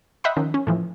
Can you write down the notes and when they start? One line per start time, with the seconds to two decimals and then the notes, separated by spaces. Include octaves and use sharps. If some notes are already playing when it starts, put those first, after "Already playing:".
0.24 D#5 E5 F#5 G5 B5 C6
0.37 D#3 F3 C#4
0.54 C#4
0.67 A2 E3 F3